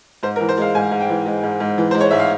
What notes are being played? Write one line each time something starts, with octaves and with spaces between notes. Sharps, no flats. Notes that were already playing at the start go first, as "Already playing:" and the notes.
G#2 C5
A#4
E3
C5
G#3 F5
G#2 G#5
G#2
G5
E3
G#3
G#2
G#2
E3
G#3 C5
C#5
G#2 E5
F5